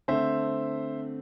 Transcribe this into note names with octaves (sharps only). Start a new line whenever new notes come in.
D3 A3 C4 C5 E5